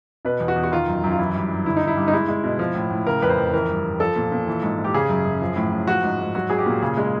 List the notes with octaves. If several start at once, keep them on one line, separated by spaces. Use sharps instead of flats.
B2 B4
E2
F#4
E2
F#4
D#3 F4
F#2
F#2
F4
E3 E4
G2
G2
D3 E4
D#4
G2
E4
G2
D#4
G#3 E4
G#3
B2
F3
A2
A2
C#3 A#4
F2 B4
C5
F2
E3 A#4
G2
G2
F3 A4
A#2
A#2
E3
G#2
G#2
G4
C#3 G#4
F#2
F#2
F3
A2
A2
F3 F#4
G#2
G#2
F#3 F#4
F#3 G#4
G4
A#2
C#3 G#4
G#3